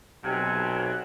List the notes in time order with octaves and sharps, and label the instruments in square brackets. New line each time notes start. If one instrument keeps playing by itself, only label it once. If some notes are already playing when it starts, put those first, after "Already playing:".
[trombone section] B1 [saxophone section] C3 [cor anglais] F#5 [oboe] G#5